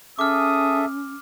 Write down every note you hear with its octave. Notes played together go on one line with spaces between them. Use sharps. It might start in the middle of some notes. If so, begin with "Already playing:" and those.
C#4 G#4 A4 E5 D6 D#6 F6